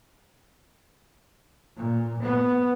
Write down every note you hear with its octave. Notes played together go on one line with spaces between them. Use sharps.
A#2
B3